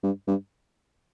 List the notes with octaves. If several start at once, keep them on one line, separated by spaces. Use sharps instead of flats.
G2
G2